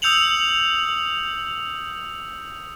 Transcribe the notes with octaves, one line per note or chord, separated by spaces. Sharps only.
D#6 E6 G6 C#7 F7 F#7